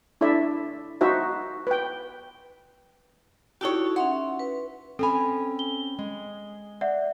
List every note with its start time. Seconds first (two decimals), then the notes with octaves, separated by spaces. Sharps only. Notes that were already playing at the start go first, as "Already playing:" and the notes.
0.21 D4 E4 A4 D5 E5
1.01 D#4 F#4 C5 E5
1.67 B4 G5
3.61 D#4 E4 F#4 G4 A4 C#5
3.96 C#4 E5 F#5 C6
4.39 B4
4.99 C4 C#4 A4 G#5 B5
5.59 G7
5.99 G#3
6.81 D5 E5 F#5